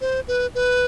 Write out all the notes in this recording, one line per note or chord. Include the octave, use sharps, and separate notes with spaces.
C5
B4
B4